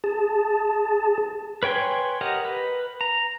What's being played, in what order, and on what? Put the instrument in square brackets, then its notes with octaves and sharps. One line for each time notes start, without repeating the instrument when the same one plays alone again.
[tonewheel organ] G#4 A5
[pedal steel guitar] B4 C#5 G5 G#5 C6
G4 A#4 D#5 F#5
B4
A#5